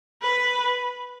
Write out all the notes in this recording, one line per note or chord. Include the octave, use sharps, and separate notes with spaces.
B4